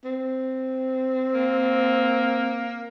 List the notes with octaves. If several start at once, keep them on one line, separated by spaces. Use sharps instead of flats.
C4
A#3